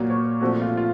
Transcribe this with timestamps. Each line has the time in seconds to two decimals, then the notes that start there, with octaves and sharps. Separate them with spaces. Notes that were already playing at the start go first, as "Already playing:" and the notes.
Already playing: A#2 F#3 A#3
0.10 C#5
0.41 A#2 F3 A3 C4 F#4
0.62 F4
0.77 F4